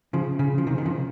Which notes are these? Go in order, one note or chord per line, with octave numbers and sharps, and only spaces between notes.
C#3 F3
C#3
F3
C3 D#3
D#3
C#3 F3